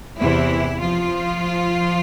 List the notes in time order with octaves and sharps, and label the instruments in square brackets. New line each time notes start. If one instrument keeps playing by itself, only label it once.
[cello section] E2 C3 E3 E4
F3 F4